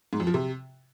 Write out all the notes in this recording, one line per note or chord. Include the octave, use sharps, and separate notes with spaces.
G#2
F2
F3
C3